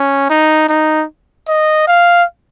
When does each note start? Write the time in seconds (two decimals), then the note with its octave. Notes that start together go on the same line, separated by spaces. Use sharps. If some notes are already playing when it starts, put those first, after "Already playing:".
Already playing: C#4
0.30 D#4
0.69 D#4
1.48 D#5
1.88 F5